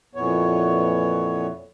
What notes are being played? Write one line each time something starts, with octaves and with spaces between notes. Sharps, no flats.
F2 A#2 E3 B3 C#5